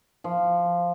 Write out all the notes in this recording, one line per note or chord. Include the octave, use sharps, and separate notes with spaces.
F3